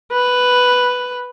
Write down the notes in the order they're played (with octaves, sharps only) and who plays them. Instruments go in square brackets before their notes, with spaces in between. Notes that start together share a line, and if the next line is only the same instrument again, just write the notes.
[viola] B4